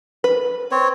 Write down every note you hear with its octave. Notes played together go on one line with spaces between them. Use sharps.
B4
C4 C#5